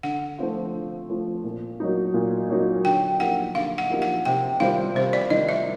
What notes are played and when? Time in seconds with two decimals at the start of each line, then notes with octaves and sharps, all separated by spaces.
0.03 D3 F#5
0.38 F3 A3 C4 F4
0.74 D3
1.09 F3 A3 C4 F4
1.44 A#2
1.80 F#3 A#3 D#4
2.14 A#2
2.50 F#3 A#3 D#4
2.85 D3 G5
3.20 F3 A#3 D#4 G4 F#5
3.55 D3 F5
3.78 F#5
3.90 F3 A#3 D#4 G4
4.02 F#5
4.25 C3 G5
4.60 D#3 G3 C4 F4 F5
4.95 C3 C5
5.13 D5
5.30 D#3 G3 C4 F4 D#5
5.49 E5